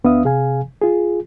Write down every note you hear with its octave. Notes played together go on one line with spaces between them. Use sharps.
D2 B3 D4 E5 F5 D#6
C3 G#4 F5 G#5
F4 G#4